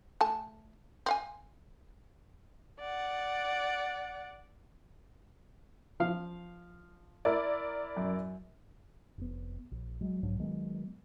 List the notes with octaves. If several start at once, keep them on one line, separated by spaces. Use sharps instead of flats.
A3 G#5 A5
C4 F5 G#5
D5 F#5
F3 F5
E4 A#4 D5
F#2
F1 B3
A#1
F#3 G#3
B1 G#2 F#3 D4
D#3 F#3 G#3 B3